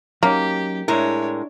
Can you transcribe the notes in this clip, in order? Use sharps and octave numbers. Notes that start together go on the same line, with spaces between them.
F#3 A#3 C#4 D#4 G4
A2 G#3 D4 E4 A#4 C#5